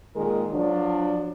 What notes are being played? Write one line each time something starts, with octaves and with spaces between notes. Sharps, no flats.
A#2 D#3 G#3 G#4 A#4
F3 F#3 D4